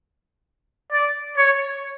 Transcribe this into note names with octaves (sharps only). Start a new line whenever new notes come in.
D5
C#5